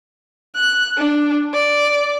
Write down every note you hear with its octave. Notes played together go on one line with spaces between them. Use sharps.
F#6
D4
D5